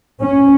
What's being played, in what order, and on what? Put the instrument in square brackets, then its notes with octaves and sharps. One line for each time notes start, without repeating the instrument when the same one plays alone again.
[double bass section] C#4